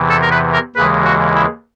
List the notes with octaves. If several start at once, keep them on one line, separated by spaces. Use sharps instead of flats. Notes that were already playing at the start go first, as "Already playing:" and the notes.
Already playing: E2 C3 E3
A4
A#4
B4
A#4
D#2 C#3 E3 G#3 B4
F#4
E4